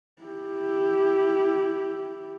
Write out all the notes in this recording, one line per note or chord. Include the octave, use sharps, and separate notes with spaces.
E4 G4